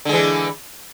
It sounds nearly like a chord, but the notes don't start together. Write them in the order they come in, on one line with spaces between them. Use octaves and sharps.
D3 G#3 E3